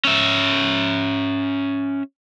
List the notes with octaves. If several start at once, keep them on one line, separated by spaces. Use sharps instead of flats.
C#4 E5